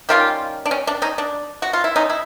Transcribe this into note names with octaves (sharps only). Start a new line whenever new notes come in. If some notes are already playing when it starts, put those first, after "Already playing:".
D#3 G3 A#3 C#4 F4 G4
D4
C#4
D4
C#4 D#4
D4
F#4
F4
E4
C#4 D#4
E4